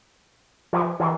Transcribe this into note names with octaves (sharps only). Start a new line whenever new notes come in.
F3
E3